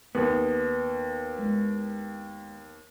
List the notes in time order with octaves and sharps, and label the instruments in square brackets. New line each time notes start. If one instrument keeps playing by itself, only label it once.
[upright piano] D#2 [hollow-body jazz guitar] B3 [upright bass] D#4
[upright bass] G#3 E4